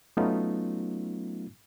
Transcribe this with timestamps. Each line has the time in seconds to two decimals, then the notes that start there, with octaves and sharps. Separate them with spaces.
0.17 F#3 A3 B3 C#4 D#4 F4